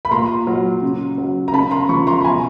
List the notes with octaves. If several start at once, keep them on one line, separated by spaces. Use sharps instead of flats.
B5
A#2 A#5 C6
F#3
C#3
F#3
A#5
C#3 A5 B5
A#5 C6
F3 B5 C#6
A#5 C6
B5
B2 G#5 A#5